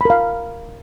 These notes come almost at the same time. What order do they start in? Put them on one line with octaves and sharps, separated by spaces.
B5 A#4 F5